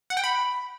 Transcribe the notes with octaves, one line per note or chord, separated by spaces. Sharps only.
F#5
G5
B5